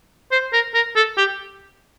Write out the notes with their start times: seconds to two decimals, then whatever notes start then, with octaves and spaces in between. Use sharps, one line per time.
0.31 C5
0.53 A#4
0.74 A#4
0.96 A4
1.17 G4